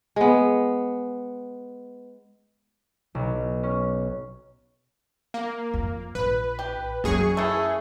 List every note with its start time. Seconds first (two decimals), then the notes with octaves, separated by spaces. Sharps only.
0.16 G#3 B3
3.15 B1
3.63 C#4
5.34 A#3
5.74 F2
6.15 A#1 B4
6.59 G4
7.04 F#2 A#3 C#4 G#4 C#6
7.37 E3 A3